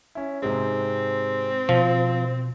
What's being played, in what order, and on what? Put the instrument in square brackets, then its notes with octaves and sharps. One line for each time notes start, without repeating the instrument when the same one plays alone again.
[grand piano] C#4 E4
[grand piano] G#2 C3 G#3 [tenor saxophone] C4
[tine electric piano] B2 [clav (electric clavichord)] F3 [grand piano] F7